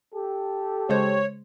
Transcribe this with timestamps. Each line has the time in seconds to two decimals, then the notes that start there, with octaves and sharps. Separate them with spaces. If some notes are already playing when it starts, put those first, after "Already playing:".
0.15 G4 A4
0.89 C#3 G#3 C5 C#5